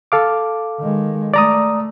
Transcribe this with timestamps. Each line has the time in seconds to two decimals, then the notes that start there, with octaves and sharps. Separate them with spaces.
0.12 A4 F5 D6
0.79 D#3 G#3
1.34 A3 D5 A#5 D#6